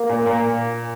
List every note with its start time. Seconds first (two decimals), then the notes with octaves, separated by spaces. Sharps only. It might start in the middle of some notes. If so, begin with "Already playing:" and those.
Already playing: A#3
0.09 A#2
0.26 A#2